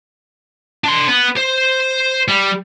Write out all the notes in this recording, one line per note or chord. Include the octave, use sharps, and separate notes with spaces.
D4 C6
B3
C5
G3